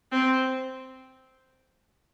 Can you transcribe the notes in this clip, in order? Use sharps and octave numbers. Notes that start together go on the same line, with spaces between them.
C4